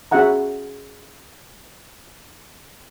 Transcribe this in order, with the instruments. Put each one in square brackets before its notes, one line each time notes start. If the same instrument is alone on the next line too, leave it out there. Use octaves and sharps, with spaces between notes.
[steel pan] C#4 F#4 G#4 E5 F#5 A#5